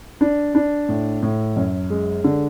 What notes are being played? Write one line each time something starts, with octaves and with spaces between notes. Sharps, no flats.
D4
D4
A2
A2
F#2
G#3
D3